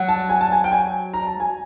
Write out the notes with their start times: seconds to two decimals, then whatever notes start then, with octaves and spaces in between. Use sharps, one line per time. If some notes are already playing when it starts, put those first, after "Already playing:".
Already playing: F#3
0.08 A5
0.29 G#5
0.41 A5
0.52 G#5
0.64 G5
0.72 G#5
1.14 A#5
1.27 A5
1.40 G#5